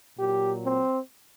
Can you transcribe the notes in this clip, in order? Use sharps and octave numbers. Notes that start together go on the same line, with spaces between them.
A#2 F#3 G4
C4